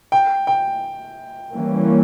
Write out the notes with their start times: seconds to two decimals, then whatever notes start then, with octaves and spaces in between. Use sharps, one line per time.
0.12 G5
0.47 G5
1.52 E3 G3 A#3 C#4